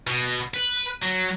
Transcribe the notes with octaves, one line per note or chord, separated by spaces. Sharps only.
B2
B4
F#3